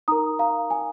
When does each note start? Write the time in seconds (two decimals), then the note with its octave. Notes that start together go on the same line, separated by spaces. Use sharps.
0.08 D#4 A#4 A#5 D#6
0.39 F5 A#5
0.70 G#5